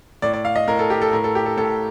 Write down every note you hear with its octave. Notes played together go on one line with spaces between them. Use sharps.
A2 D5
D5
F5
D#5
A2 A#4
A4
G4
A4
A2 A#4
A4
G4
A4
A2 A4